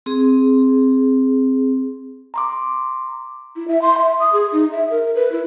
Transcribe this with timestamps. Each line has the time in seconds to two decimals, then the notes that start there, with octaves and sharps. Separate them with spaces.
0.06 C4 G#4
2.34 A#5 C6 D6
3.56 E4
3.68 E5
3.82 C6
3.98 E5
4.20 D#6
4.33 G#4
4.52 D#4
4.72 E5
4.90 A#4
5.15 B4
5.32 E4